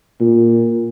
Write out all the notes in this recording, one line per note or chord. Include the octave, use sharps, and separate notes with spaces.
A#2